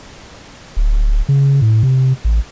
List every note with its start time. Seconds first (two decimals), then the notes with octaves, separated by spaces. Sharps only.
0.77 D1
1.29 C#3
1.62 A2
1.83 C3
2.25 A1